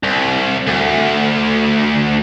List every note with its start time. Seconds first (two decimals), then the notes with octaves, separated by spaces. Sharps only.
0.03 C2
0.67 D2